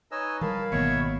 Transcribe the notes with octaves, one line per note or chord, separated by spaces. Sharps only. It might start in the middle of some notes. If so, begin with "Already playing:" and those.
D#4 B4 C#5 D#5 G#5 E6
E3 G3 A#4 F5 A5 B5
G#1 B2 D#3 A#3 C#5 E5 C#6